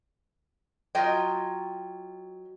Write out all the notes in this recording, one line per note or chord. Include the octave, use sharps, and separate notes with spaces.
F#3 F4 D#5 G5